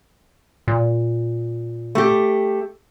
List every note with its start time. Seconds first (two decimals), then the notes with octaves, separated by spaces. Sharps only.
0.68 A#2
1.95 A3 G4